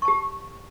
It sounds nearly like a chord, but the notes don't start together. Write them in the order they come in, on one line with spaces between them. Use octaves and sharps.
C#6 A5 G4